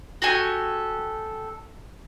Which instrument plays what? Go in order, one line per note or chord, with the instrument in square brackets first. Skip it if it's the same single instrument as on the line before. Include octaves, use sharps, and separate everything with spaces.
[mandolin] F#4 G4 A4 G#5